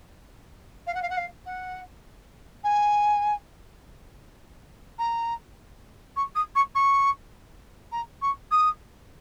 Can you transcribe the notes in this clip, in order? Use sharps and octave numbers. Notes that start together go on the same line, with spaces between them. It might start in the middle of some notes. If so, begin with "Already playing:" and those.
F5
F#5
F5
F#5
F5
F#5
G#5
A#5
C#6
D#6
C#6
C#6
A#5
C#6
D#6